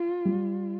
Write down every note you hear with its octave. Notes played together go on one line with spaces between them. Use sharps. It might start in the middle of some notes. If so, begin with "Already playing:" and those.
Already playing: F4
G3